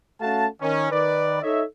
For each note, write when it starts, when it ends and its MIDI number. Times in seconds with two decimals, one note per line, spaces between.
0.22 0.46 57
0.22 0.46 61
0.22 0.46 66
0.22 0.46 77
0.22 0.46 81
0.61 0.90 51
0.61 0.90 61
0.91 1.41 51
0.91 1.41 71
0.91 1.41 74
1.42 1.63 63
1.42 1.63 69
1.42 1.63 73
1.42 1.63 75
1.42 1.63 76